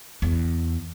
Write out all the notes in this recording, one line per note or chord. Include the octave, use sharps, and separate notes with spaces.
E2